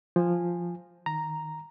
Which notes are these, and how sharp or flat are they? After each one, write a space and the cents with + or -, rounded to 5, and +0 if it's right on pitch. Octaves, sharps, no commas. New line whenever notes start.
F3 +0 G#5 -15
D#3 +0 A#5 +0